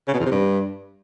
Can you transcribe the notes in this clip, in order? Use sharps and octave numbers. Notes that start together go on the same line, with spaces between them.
C#3
B2
E2
C3
G2